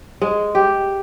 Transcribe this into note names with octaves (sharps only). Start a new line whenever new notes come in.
G#3
G4